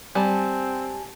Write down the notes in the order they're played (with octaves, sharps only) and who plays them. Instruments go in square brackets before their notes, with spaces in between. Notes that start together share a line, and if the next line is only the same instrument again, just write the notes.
[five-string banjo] G3 [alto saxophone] C4 [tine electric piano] G#5 A5